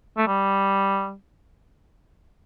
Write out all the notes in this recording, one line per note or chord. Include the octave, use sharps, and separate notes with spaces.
A3
G3